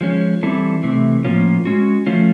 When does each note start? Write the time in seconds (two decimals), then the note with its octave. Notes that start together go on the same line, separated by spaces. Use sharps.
0.01 F3 G#3 C#4
0.43 E3 G3 C4 E4 A4
0.83 C3 E3 A3
1.24 A2 F3 A#3 C#4 F4
1.65 G#3 C#4 F#4
2.06 F3 A3 C#4 F4